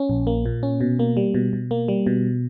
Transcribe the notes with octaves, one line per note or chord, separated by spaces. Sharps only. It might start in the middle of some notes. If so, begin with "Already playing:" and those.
Already playing: C#4
A#1
A#3
A#2
C#4
B2
A#3
G3
B2
B2
A#3
G3
B2